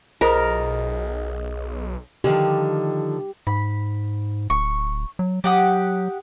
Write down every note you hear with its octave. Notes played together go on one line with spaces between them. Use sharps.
B1 F4 G#4 A#4 C5 D#5 D#6
D3 D#3 F3 G4
G#2 B5
D1 C#6
F#3
F#3 G4 F#5 D#6